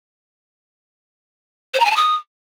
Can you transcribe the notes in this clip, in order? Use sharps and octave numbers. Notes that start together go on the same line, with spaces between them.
C5
A#5
G#5
A5
D#6